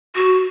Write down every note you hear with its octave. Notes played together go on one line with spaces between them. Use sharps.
F#4